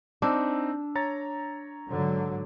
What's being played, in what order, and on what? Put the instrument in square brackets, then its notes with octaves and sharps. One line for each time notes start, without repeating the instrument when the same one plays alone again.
[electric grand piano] C4 D#4 E6 [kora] D4
[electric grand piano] C#5 A#5 A6
[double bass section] G#2 D3 F#3